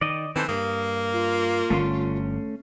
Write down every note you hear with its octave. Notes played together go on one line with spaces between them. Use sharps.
D#3 D5 D#5
D#3 E3 C4 A4 C5
G2 A#3 D#6
F4
G1 D3 A3 C#4 C6